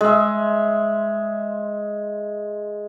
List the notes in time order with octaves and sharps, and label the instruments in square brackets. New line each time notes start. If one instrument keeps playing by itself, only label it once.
[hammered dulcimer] G#3 E5